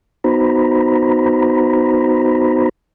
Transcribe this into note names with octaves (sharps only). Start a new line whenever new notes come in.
B3 D#4 F#4 C5 A#5 B5